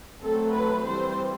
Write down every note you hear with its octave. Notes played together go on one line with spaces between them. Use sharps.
F#3 A3 C4 A4
B4
E3 G3 C4 C5